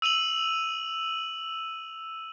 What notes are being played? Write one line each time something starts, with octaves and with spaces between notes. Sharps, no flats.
E6 D#7 F7 F#7